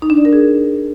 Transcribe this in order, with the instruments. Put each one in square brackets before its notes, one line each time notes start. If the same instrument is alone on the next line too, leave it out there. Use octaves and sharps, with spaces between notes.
[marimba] D#4
D4
D5
A#4
G#4